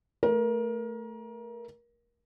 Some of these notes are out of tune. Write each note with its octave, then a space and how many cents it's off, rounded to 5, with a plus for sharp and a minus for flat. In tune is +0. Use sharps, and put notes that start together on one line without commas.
A3 +5 A#4 +25